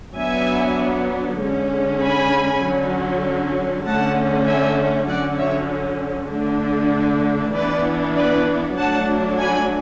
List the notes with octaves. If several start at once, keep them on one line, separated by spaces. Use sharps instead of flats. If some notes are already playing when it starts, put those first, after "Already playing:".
F#3 B3 D4 E5 G#5
D3 G#3 C#4
G#5 B5
D3 F#3 C#4
D3 A3 C#4 F#5 A5
E5 G#5
D3 F#3 C#4 D5 F#5
C#5 E5
D3 A3 D4
E3 B3 D4 B4 D5
B4 D5
F#3 A3 D4 F#5 A5
G#5 B5